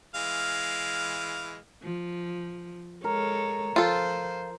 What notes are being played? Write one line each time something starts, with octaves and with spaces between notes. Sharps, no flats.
E3 G#3 F5
F3
G#3 A4 A#4 C#5
F3 F4 A4 C5